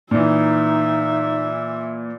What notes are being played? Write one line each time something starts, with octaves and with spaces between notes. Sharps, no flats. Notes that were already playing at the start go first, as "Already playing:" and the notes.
A#2 E3 D#4 E5